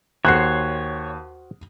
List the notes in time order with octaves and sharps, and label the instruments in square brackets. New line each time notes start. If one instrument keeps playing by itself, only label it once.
[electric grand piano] D#2 [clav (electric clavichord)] F#4 C5 G5 [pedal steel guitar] C#5 [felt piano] F#6 C7